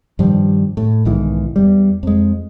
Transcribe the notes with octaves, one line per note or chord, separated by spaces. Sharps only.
G2 D#3 F3 G3
A2
B1 G#2 D#3 E3
E2 G3
F2 G#3